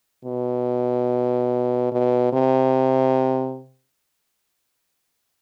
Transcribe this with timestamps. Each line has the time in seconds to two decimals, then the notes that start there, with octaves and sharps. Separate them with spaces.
0.25 B2
1.92 B2
2.33 C3